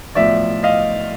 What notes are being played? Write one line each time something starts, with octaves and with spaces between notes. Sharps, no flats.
B1 A2 F3 D5 E5
D#5 F5